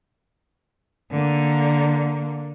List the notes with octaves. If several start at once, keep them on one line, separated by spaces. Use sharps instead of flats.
D3 A#3